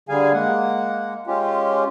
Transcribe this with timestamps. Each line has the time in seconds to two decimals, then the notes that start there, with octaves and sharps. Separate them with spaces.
0.09 D3 G3 G#4 F5 G#5
0.33 G#3 A#3 F#5
1.27 G#3 C#4 F4 G4